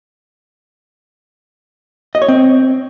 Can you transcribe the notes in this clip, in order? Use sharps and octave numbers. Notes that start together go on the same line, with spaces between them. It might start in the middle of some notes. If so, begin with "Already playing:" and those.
D#5
C#5
C4